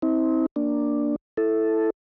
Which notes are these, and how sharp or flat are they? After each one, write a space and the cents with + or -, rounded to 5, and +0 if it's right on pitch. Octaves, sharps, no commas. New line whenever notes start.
C4 +0 E4 -45
A#3 +0 D4 +0
E4 +0 A4 +0